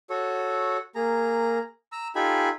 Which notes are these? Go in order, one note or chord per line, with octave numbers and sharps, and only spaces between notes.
F#4 A4 C#5
A#3 G#4 A#5
A#5 E6
D#4 F4 G4 A4 G#5 B5